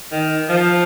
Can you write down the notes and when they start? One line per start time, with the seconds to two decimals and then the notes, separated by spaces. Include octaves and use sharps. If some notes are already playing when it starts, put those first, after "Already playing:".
0.12 D#3
0.49 F3